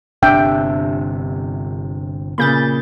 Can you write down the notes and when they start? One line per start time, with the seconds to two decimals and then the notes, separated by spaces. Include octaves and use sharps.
0.23 G1 C3 D4 E5 G5
2.38 A#2 C#3 B5 G6 A6